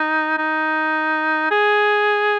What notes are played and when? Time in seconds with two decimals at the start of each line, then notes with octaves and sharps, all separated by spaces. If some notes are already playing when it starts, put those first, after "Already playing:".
Already playing: D#4
0.38 D#4
1.51 G#4